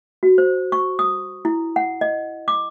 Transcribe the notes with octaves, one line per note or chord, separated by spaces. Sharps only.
F#4
C5
C#6
D#6
E4
F#5
D#5
D6